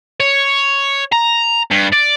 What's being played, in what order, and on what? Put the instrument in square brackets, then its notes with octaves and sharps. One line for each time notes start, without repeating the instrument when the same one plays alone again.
[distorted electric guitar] C#5
A#5
G2
D5